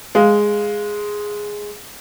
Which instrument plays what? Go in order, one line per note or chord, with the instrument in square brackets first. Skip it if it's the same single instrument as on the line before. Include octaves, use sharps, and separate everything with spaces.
[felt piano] G#3 F5